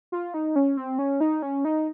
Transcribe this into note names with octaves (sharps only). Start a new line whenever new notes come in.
F4
D#4
C#4
C4
C#4
D#4
C#4
D#4